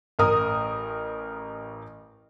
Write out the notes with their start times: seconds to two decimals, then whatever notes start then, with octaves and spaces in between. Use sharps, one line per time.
0.19 A1 A#4 D#6